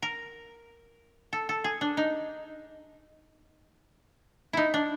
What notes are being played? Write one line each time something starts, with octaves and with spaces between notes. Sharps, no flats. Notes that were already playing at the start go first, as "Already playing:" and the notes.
A#4
A4
A4
G#4
D4
D#4
D#4 E4
D4